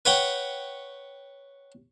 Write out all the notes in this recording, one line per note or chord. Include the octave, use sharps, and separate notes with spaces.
B4 C#5 F#5 G5